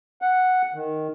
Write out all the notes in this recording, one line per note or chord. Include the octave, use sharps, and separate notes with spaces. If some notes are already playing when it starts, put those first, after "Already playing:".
F#5
D#3